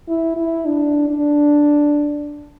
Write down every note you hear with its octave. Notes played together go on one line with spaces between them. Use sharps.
E4
E4
D4
D4